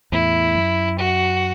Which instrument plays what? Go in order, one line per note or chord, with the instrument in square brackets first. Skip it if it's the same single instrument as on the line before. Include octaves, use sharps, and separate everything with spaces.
[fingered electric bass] E2 A2 [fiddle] E4
[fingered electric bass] F#2
[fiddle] F#4